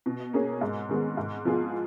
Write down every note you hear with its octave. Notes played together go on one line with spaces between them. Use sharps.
B2
A#3 C#4 G#4
G#2
D#3 G#3 B3
G#2
F3 B3 F4 G#4